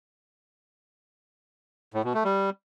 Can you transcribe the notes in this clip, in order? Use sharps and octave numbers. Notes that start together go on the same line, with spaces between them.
A2
B2
A3
G3